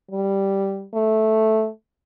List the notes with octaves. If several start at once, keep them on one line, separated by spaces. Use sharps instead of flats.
G3
A3